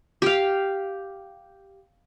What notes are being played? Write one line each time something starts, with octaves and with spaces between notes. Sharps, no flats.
G4 F5